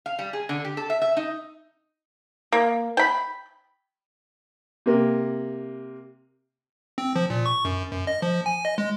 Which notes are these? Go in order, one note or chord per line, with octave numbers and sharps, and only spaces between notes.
F5
G3
G#4
D3
G4
A4
E5
E5
D#4
A#3
G5 B5
C3 A#3
C4
F3
A#2
C#6
F#2
F#2
D#5
F3
G#5
D#5
G#3